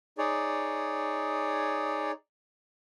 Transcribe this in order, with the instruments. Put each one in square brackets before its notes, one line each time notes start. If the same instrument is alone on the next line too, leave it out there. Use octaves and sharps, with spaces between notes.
[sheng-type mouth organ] D#4 G#4 C#5 D5